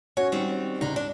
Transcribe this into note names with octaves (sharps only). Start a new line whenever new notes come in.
C#4 F#4 C#5
D#3 G3 C4
C#2 D4 D#4
G#2 D4